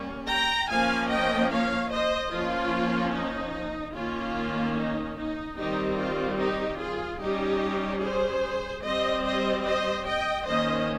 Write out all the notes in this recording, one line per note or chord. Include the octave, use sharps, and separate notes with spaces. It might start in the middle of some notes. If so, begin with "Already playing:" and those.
Already playing: G3 A#3 C#4
G5 A#5
F3 A#3 C#4 F5 G#5
D#5 G5
C#5 F5
C5 D#5
F3 A#3 C#4 F4
D#4
D#3 A#3 C#4 F4
D#4
D#4
D#3 G3 C4 D#4 G4
F4
D#4 G4
F4 G#4
G3 C#4 D#4 G4
G#4 C5
G3 C4 C5 D#5
C5 D#5
C5 D#5
D#5 G5
D#3 A#3 C#4 C5 D#5